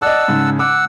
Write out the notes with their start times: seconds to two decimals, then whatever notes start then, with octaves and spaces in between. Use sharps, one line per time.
0.02 D5 D#5 F#5 A5 E6
0.28 G#2 C#3
0.59 F#5 D6 E6